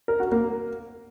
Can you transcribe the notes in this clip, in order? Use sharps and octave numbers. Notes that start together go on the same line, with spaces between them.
A#4
F#4
A#3